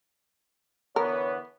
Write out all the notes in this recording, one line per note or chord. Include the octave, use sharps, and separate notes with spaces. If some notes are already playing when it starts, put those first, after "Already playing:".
D3 E3 B3 A#4 C#5